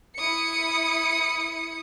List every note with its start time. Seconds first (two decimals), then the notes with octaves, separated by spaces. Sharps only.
0.18 E4 D#6 C#7